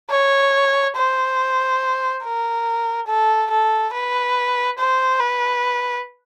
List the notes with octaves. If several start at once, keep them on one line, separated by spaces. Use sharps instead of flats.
C#5
C5
A#4
A4
A4
B4
C5
B4